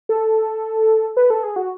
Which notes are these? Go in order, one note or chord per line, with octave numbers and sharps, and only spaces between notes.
A4
B4
A4
G#4
F#4